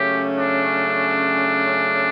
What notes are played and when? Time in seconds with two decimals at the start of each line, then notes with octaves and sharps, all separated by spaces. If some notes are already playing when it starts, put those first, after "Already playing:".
Already playing: C#3 F#3 A3 C#4 G4
0.37 D4